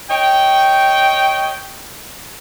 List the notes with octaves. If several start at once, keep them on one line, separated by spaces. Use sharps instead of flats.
C#5 D#5 G5